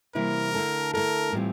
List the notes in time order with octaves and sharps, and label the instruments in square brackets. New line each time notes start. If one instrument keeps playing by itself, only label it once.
[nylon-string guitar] C3 E3 G3 A#3 E4 [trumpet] A#4
[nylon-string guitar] D3 A3 E4 A4
[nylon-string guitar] D3 A3 E4 A4 [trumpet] A#4
[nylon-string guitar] A2 E3 G3 C4 F4